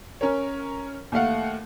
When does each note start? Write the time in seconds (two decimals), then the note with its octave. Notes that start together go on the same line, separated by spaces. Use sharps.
0.21 C#4 A#4 C#5
1.12 D#2 A3 F5 F#5